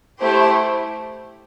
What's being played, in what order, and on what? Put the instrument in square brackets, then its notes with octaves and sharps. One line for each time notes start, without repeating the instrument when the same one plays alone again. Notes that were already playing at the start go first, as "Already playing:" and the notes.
[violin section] A3 E4 G4 C5